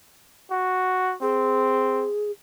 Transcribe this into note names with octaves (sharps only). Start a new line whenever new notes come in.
F#4
C4 G#4